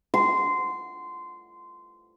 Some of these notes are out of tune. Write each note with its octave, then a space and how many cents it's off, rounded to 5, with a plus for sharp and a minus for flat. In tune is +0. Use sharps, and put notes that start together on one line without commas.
C6 -15